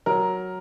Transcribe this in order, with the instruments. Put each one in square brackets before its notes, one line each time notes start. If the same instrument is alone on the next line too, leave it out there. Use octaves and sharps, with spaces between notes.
[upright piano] F#3 A#4